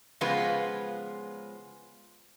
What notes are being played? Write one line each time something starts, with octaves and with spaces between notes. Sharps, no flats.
C#3 F3 G#3 B3 F4 B4